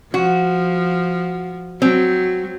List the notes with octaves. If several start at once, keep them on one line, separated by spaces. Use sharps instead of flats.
F3 F#4
F#3 C4